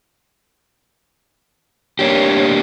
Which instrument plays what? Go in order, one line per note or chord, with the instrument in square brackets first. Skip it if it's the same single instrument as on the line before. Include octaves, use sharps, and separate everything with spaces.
[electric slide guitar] A#3 D4 G4 [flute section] C#5